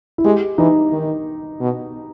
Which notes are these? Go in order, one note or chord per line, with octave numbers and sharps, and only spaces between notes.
E4
G#3 G4
E3 D#4
D#3
B2